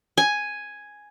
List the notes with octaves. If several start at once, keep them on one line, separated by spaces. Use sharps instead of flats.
G#5